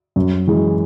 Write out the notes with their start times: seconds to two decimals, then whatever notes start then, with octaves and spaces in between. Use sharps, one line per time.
0.16 F#2
0.47 E3 G#3